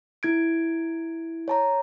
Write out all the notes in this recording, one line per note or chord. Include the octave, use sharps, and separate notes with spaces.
E4 G#6 D7
C#5 A5 A#5